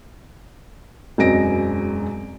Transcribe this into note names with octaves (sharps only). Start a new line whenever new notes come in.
E1 F#2 C4 D#5 A#6 D7